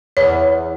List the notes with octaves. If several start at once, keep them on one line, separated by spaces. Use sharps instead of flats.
E2 C#5